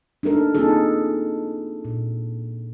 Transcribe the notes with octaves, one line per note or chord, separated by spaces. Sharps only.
D4 D#4 A4 A#4
A#3 C4 D#4 F4 G#4 A4
A#2